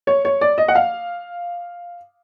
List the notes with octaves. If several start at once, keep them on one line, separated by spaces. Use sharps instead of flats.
C#5
C#5
D5
D#5
F#5
F5